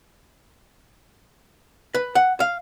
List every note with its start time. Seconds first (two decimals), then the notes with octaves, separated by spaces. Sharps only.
1.94 B4
2.15 F#5
2.40 F5